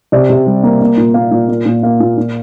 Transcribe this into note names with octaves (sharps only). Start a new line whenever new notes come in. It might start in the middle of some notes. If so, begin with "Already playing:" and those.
C3 D5
C3
G3
A#3
A#3
A#2
A#3 F5
A#2
A#3
A#2
A#3 F5
A#2
A#2